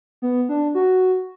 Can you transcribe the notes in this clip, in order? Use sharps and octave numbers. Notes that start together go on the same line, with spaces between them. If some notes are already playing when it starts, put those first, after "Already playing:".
B3
D4
F#4